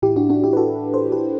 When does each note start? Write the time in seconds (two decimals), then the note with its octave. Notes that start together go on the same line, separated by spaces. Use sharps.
0.02 A2 E3 E4 G4
0.16 D4 F#4
0.29 D4 F#4
0.44 E4 G4
0.53 B4
0.57 F#4 A4
0.94 A4 C5
1.12 G4 B4